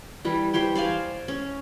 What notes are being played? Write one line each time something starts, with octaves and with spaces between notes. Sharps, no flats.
E3 G3
G4 C5 C#5 G5
C5 D5 F5 G#5
C#4